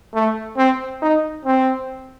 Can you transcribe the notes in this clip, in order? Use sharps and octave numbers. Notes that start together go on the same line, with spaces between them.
A3
C4
D#4
C4